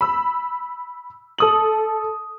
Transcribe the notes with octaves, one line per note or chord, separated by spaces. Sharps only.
B5 E6
A4 D#6 F#7